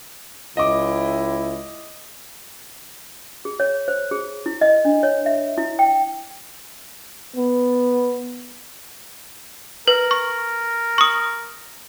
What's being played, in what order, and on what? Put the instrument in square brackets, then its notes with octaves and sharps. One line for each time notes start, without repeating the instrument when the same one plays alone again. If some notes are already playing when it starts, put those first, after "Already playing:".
[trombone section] C#2 E4 [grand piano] D#5 D6
[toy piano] G#4
C#5
C5
G#4
E4
D#5
D4
C#5
E5
E4
G5
[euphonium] B3
[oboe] A#4 [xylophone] B4
[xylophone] C#6
C#6 D#6